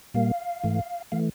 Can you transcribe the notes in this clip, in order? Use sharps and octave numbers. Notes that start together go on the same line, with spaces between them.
A#2 G3 A#3 F5
G#2 E3 A3
E3 A3 F5